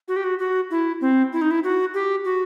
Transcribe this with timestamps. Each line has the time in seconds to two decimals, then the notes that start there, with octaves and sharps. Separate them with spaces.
0.08 F#4
0.16 G4
0.24 F#4
0.39 F#4
0.71 E4
1.01 C4
1.33 E4
1.41 D#4
1.51 E4
1.64 F#4
1.94 G4
2.25 F#4